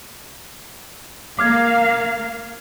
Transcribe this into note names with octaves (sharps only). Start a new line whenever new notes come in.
A#3 F5 D6 F6 G#6